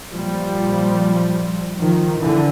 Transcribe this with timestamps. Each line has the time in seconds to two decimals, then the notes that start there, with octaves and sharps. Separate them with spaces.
0.11 A#2 F3 G3
1.78 D#3 F3
2.20 D3 E3